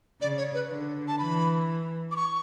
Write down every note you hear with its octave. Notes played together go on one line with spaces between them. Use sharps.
C#3 D5
C#5
B4
D3
A5
E3 B5
D6
C#6